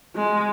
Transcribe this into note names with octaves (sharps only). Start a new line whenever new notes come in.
G#3